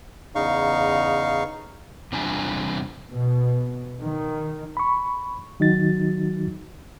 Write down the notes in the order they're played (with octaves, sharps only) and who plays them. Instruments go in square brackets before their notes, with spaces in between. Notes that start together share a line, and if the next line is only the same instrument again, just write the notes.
[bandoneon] E2 C#3 D#4 F5 C#6
[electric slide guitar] E2 C3 G3 D4 F4 G#5
[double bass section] B2
D#3
[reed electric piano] B5 C#6
D#3 F#3 D#4 F#4 A6